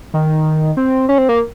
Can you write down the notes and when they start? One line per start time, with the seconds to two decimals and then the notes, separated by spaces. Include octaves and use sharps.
0.14 D#3
0.77 C4
1.09 C#4
1.18 C4
1.29 A#3